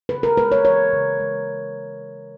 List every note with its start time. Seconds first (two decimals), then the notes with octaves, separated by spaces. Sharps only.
0.09 C#3 B4
0.23 A#4
0.37 G#3 B4
0.52 C#5
0.65 E3 C#5
0.93 C#3
1.20 G#3